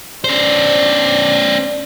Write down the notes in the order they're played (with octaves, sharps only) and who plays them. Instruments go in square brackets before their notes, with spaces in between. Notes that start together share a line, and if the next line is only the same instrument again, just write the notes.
[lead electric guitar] C#4 C5 [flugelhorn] D4